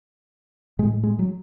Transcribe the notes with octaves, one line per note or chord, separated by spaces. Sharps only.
A2 G#3
G#3
F#3